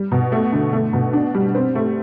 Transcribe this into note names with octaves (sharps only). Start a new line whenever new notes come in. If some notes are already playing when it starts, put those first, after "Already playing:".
Already playing: G3
B2
A3
D3
A3
B2
D4
G3
C4
A3